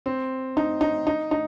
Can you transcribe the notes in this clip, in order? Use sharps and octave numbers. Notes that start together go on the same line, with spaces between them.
C4
D#4
D#4
D#4
D#4